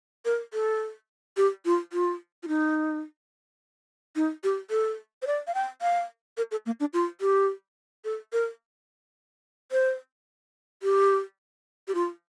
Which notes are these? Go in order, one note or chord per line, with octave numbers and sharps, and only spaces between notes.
A#4
A4
G4
F4
F4
F4
D#4
D#4
G4
A4
C5
D5
F5
G5
F5
A#4
A4
A#3
D4
F4
G4
A4
A#4
C5
G4
G4
F4